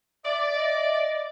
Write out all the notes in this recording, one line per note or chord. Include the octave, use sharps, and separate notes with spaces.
D5 E5
D#5